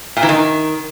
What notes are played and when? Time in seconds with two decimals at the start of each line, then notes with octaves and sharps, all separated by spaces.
0.17 A#2
0.23 E3
0.29 D#3